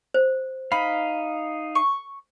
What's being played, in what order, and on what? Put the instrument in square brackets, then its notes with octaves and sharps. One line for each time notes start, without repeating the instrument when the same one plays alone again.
[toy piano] C5
[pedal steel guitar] D#4 F5 [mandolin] B5
[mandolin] C#6